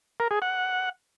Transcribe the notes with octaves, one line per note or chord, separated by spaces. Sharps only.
A#4
G#4
F#5